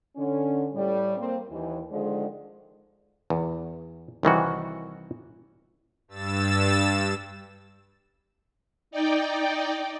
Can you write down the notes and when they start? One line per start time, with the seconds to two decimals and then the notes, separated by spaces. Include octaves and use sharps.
0.16 D3 C#4
0.74 A2 G3
1.17 A#3 C4
1.49 D#2 E3
1.91 D3 D#3 F3 G#3
3.30 E2
4.23 C2 D#3 E3 F#4
6.08 G2 E6 A6 E7
8.91 D#4 D5 G5